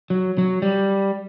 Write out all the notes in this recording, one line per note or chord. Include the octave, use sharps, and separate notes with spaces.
F#3
F#3
G3